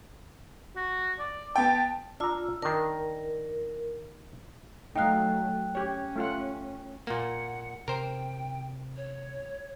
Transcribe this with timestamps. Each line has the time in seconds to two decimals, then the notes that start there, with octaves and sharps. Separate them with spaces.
0.76 F#4
1.19 D5
1.56 B3 G5 A5
2.20 D4 F4 A#5 E6
2.62 D#3 D4 A#4
4.96 F#3 A3 D#4 F5 G5 F#6
5.75 C#4 G4 C#5
6.16 A3 F4 F#5
7.07 A#2 A#3 F#5
7.88 C3 A#4 C5 G5
8.97 C#5